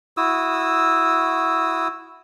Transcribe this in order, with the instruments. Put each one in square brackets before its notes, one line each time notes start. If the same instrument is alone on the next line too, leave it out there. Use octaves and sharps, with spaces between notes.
[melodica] E4 F#4 D#6 E6